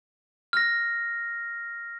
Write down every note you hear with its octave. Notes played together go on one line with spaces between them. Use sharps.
F6 A#6